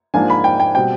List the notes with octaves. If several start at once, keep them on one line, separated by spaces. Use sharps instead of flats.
G#2 F3 A#3 D4 G#5
B5
G5
G5
B2 G3 C4 G5